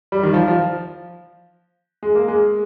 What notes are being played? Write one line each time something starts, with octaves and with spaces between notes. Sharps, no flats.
G3
D#3
F3
F3
G#3
A#3
G#3